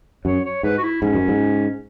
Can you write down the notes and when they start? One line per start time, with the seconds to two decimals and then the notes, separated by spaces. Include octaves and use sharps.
0.25 F#2 C#5
0.45 C#5
0.63 G#2 B4
0.78 F#4
0.83 E4
1.02 G#2 C#4
1.14 F#2
1.28 G#2